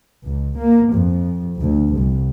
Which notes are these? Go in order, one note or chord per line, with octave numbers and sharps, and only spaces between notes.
C#2
A#3
F2
D2
C2